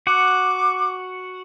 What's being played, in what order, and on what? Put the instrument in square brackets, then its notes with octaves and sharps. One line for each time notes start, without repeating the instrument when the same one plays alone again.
[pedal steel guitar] F#4 F#5 [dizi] D6